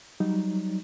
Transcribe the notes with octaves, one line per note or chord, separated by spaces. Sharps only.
F#3 G3 D#4